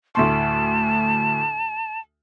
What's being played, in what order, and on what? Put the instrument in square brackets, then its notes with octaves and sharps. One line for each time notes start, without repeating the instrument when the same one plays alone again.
[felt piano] D2 A2 C6 [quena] A5